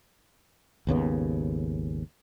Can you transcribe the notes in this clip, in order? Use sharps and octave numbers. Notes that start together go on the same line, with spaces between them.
G#1 D#2 C#3 B3